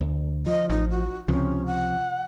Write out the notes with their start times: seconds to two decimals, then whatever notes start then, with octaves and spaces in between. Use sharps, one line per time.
0.01 D2
0.46 F3 D#5
0.70 A1 D#4
0.90 F#4
1.28 C#2 C3 F3 C#4
1.66 F#5